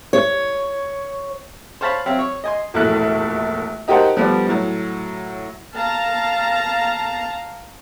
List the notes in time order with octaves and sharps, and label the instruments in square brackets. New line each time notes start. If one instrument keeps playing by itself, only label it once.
[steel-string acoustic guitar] C#5
[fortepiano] C5 C#5 F5 A5 B5
F#3 C4 E5 F5
C#5
D#5 G#5 C6
[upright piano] E1 A#1 A2 A3 F#6
D#4 G4 A#4 C5 F#5 A5
D3 F3 G3 B3 D4
A2 F#3
[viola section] F5 A5 A#5